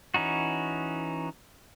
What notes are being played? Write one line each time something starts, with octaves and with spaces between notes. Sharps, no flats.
E3 C#4 D#4 F#4